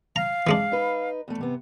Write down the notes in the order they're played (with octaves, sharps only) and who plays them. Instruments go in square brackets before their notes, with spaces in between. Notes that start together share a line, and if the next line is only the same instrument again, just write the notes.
[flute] F5 [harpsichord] A#5
[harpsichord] E3 G#3 D4
[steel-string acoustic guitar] D#4 B4
E2 A3
C3 B3